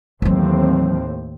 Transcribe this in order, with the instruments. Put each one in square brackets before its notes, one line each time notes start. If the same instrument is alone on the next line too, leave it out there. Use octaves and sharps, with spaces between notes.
[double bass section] D#2 A2 C4 [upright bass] E3 F#3